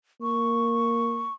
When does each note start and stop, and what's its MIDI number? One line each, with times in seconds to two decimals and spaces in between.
0.22 1.28 58
0.22 1.34 85